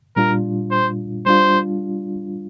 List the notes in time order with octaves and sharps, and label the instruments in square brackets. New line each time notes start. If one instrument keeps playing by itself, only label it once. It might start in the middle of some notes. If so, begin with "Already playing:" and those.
[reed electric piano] A#2 G3 D4 F4 [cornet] A#4
[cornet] C5
[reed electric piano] G3 D4 F4 [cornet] C5